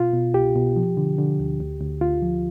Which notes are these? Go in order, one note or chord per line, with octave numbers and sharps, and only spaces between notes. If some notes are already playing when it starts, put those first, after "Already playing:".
Already playing: B2 F4
B2
C2 G4
B2
F3
D3
D3
D2
D2
D2
D2 F4
F3